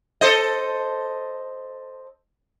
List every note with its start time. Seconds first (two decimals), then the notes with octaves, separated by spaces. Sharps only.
0.21 A4 C5 D#5